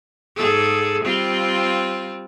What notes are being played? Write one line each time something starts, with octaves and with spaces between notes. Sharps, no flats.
G#2 G#4 A4
G3 C4 F4